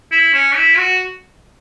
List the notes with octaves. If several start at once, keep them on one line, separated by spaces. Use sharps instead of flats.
E4
C#4
E4
F#4